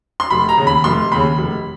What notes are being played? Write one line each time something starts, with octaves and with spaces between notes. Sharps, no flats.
C6
F1 B5
A#5
D#2 C#3
B5
F1 C6
D#2 C#3 B5
F1